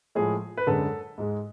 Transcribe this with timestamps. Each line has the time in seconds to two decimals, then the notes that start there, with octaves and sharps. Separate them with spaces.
0.15 A2 F3 G#3 G#4
0.57 B4
0.66 F#2 D3 G#3 A4
1.18 G#2 G#3